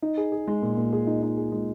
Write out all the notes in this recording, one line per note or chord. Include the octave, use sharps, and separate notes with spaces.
D#4
G#4
G#4
G#3
A#2
A#2
G#4
D#4
D#4
G#4
G#3